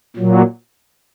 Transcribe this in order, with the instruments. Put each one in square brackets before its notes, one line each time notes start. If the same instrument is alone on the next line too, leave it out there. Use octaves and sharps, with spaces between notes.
[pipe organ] A#2 F#3